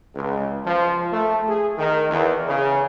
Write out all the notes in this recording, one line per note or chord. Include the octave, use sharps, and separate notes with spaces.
C#2
F3
A3
G#4
D#3
E2
C#3